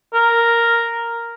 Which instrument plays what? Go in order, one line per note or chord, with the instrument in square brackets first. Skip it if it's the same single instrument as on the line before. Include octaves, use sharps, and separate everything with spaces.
[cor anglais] A#4